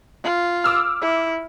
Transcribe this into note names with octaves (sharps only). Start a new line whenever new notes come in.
F4
D6 E6 F6
E4